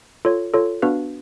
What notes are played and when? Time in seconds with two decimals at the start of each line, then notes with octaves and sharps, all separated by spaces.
0.25 F4 A4 C#5
0.54 F4 A4 C#5
0.82 B3 D4 F#4 B4 F5